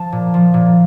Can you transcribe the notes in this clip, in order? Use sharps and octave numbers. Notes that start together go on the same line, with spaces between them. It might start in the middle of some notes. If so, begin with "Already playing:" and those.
Already playing: F3 A5
A#2
F3
A#2